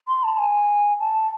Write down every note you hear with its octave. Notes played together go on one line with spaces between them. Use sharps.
C6
A5
G#5
A5